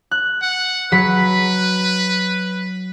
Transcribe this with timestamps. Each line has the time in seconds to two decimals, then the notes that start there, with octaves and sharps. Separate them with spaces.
0.11 F#6
0.42 F#5
0.92 F#3 B4 B5 B6